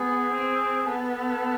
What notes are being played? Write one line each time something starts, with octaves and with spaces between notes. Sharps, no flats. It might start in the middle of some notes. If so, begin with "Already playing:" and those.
Already playing: B3 G#4
C4
B3 A4